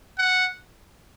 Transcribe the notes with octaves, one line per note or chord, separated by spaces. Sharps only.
F#5